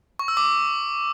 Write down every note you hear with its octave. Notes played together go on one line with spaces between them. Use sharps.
C#6
E6
D6